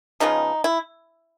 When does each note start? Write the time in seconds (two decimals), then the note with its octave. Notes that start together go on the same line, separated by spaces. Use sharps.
0.20 C#3 F3 G#3 B3 D#4
0.64 E4